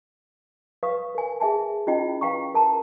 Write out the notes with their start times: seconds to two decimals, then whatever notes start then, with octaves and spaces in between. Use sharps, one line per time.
0.83 B4 F5 C#6 D#6
1.15 A#4 G#5
1.40 G#4 E5 G#5 A5
1.87 C#4 E4 F4 D#5 G5
2.21 B4 F5 G5 A#5 C#6
2.54 A#4 A5 A#5